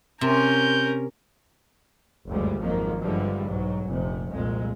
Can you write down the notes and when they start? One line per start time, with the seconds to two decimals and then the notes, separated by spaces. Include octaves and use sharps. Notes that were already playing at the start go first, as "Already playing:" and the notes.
0.21 C3 C#4 A#4 G6
2.28 F#1 D2 G2 F3 G3 G#3
2.60 G#1 F2 D#3 F3 F#3 A#3
3.01 G2 D3 E3 F3 G3 G#3
3.46 B1 G#2 F#3
3.87 F1 A#1 C3
4.31 C2 F2 A#2 G#3